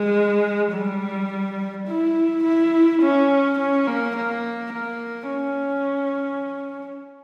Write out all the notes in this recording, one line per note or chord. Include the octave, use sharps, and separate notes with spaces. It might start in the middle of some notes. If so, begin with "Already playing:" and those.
Already playing: G#3
G3
E4
E4
C#4
C#4
A#3
A#3
A#3
C#4